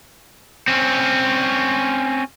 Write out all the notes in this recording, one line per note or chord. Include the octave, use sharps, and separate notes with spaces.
C4 C#4